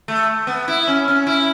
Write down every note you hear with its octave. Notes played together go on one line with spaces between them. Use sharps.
A3
B3
E4
C#4
C#4
E4